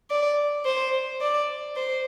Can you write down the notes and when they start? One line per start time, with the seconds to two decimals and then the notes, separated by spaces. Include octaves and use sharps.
0.10 D5
0.65 C5
1.21 D5
1.76 C5